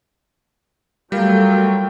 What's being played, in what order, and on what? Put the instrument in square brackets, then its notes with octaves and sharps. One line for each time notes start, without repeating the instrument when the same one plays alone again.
[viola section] F#3 A3 [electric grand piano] G3 [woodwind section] F4 A#4 G5